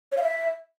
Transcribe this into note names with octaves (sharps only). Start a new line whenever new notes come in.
C#5
F5
E5